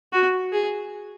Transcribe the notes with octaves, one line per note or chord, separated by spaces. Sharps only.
F#4
G#4